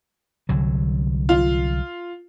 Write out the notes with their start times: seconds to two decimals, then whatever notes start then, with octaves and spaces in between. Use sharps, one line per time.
0.49 C2 D3 F#3
1.29 F4